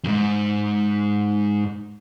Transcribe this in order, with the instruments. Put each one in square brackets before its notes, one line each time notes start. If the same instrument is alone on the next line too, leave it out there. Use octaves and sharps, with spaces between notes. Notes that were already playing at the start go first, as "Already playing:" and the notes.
[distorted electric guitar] F2 G#2